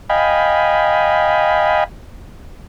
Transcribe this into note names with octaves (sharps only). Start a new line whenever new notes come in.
D#5 F5 G5 G#5 B5